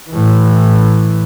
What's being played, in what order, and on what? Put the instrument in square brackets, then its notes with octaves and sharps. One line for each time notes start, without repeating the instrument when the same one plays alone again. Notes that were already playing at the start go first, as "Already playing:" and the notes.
[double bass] A2 E3